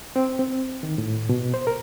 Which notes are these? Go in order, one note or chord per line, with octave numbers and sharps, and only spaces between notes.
C4
C4
D#3
A2
B2
C5
A#4